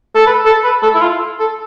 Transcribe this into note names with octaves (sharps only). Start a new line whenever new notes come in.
A4
B4
A4
B4
A4
E4
F4
A4